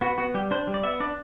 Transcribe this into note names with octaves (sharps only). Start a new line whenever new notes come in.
B3 F#4
B3 F#4
G3 G4
D4 C5
G3
D5
B3 E5
D4 D5